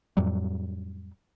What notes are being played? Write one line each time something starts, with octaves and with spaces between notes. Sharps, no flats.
F2 A2 F#3 G3